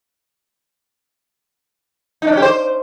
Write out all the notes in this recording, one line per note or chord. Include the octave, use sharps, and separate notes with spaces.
D#4
D4
C#4
G4
C5